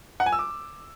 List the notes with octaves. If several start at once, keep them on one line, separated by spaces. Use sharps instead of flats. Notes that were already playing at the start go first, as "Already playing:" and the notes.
F#5
G#5
E6
D6